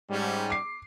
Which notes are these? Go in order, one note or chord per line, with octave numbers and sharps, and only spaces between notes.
G#2 G3 C#4
D6 C7